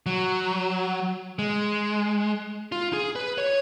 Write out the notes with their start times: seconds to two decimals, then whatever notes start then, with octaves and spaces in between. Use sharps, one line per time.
0.06 F#3
1.39 G#3
2.72 F4
2.93 G#4
3.16 B4
3.38 C#5